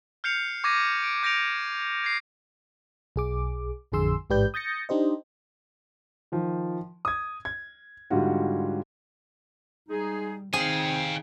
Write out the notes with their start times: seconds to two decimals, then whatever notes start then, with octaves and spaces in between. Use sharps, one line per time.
0.24 F6 G6 C7 C#7 F7
0.64 C#6 D6 G#6 A#6 D#7
1.03 D7
1.23 D6 G6 A#6 C#7 D7 F7
2.04 G#6 C7
3.16 B1 G#4 D6
3.92 A1 F2 D3 G#4 C6 E6
4.30 A1 G#2 G4 B4 D5 G6
4.54 D#6 G6 A6 A#6 C#7
4.89 D4 D#4 G4 C5 D#5
6.32 D#3 F3
7.05 D#6 G#6
7.45 G#6
8.10 G#2 D3 G3 F4 F#4 F#5
9.89 G3 G#3 D#4 G#4
10.53 D#3 C4 D#4 G#4 F5 G5 G#5